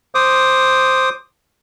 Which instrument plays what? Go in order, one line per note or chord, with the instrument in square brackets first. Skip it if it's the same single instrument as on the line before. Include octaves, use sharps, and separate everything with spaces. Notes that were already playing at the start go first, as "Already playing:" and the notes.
[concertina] C5 D6 D#6